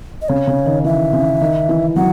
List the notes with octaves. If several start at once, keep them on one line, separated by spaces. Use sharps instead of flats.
D#5
C#3 C#5
C#3
D#3
E3 E5
C#3
D#3
E3
F#3 F#5